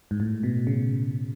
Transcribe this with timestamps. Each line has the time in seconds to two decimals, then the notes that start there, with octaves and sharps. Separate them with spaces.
0.11 G#2
0.20 A2
0.43 B2
0.67 C#3